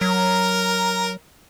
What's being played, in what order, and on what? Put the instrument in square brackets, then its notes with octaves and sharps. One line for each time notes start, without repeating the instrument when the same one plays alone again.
[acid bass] F#3 [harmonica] A#4 A#5